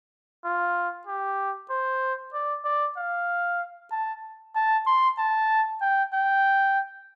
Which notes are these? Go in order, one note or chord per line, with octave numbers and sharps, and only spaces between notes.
F4
G4
C5
D5
D5
F5
A5
A5
C6
A5
G5
G5